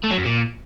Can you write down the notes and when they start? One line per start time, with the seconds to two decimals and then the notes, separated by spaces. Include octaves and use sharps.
0.04 A3
0.11 F#3
0.18 F#2
0.25 A#2